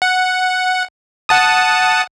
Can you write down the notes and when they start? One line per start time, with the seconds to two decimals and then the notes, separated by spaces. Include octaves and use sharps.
0.02 F#5
1.29 F#5 A5 D#6